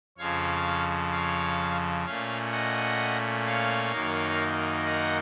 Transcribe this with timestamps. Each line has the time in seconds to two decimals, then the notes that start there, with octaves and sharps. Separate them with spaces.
0.18 F2 C#3 F3 C#5 F5
1.12 C#5 F5
2.05 A#2 A3 C#4 C#5 F5
2.52 D#5 F#5
3.46 C#5 F5
3.92 F#2 D#3 A#3 D#4
4.85 D#5 F#5